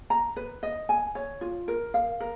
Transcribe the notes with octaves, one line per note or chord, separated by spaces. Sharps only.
A#5
B4
D#5
G#5
C#5
F4
A#4
F5
A#4